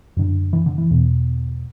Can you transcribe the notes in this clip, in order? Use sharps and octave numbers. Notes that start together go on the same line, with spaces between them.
F#2 D3
E3
D3
E3
E2 B2